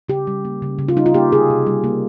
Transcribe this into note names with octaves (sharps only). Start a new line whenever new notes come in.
C#3 G4
G3
A#3
C#3
C#3
F4
G3 D#4
F4
A#3 G4
C3 G#4
C3
G3
A#3